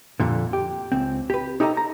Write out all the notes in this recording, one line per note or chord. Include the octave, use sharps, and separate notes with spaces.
F2 A#2 D3
G4
C#2 C4
G4 B4
D#4 G4 A4 B4 D#5 A#5
A#5